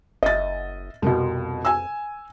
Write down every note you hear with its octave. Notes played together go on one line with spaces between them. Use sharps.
F#1 D#5 E5 A6
C2 F2 B2
G#5 E6